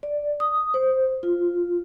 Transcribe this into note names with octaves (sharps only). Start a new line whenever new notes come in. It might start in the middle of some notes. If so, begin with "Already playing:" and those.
D5
D#6
C5
F4